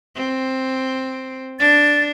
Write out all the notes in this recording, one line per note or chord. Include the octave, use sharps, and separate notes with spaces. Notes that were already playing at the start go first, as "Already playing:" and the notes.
C4
D4 A6